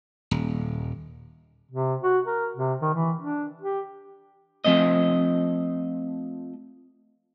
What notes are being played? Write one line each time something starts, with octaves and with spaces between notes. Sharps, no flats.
D#1
C3
F#4
A#4
C3
D#3
E3
D4
G4
F3 A3 C4 D#5